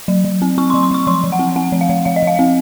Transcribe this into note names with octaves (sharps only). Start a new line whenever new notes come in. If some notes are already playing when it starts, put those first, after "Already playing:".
F#3
F#3
C4
C4 C#6
C6
F#3
C6
F#3 C#6
F3 C6
F3
F#5
C4
C4 F#5
F3
F5
F3
F3 F5
D#5
F3 F5
C4